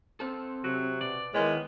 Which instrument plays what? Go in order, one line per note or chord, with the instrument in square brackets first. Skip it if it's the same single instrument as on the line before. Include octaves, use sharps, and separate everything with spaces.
[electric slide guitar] C4 A4
[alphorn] C3 [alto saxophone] F#3
[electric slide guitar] B2 [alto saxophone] D5
[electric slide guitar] D#3 A#4 C#5 [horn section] G#3 [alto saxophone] B3 [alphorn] E4